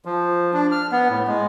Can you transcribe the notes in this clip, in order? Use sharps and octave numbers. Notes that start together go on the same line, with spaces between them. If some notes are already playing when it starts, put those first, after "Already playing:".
F3
D4
F6
B3
A2
G#3